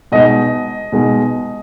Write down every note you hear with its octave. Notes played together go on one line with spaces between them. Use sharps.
B2 G#3 D#4 D#5
B2 G#3 D#4